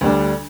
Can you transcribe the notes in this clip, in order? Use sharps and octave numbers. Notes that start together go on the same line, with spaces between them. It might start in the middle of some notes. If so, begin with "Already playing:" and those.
D2 D3 G3 D4